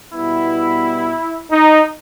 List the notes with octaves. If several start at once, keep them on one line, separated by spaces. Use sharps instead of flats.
B2 G3 B3 E4
D#4